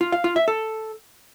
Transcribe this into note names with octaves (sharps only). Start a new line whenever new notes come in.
F4
F5
F4
E5
A4